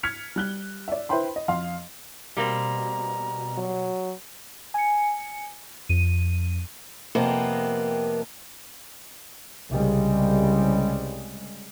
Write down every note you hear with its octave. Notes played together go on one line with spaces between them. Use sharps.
F6 G#6 B6 C#7 F7
G3 F#6 G7
D5 E5
E4 B4 C5 G5 B5 C6
D#5
F2 F5 C6
B2 G3 A#3 C4 A#5
F#3
G#5 C#7
F2 D#7
F2 C3 A#3 B3 A#4
C2 C#3 G3 G#3